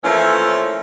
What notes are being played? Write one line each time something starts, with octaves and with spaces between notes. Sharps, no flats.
E3 F3 A3 A#3 C#4 E4